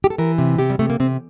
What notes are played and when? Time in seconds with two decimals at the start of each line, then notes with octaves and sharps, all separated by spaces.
0.04 G4
0.10 A4
0.18 E3 A#4
0.38 C3
0.58 C3 G4
0.70 G3
0.79 C3 A3
0.90 A#3
1.00 C3 C4